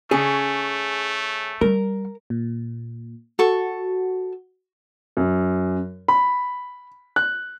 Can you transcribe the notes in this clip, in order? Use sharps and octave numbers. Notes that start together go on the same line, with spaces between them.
C#3 A3 C#4 G#4
G3 A#4
A#2
F#4 A4 C#6
F#2
B5
F#6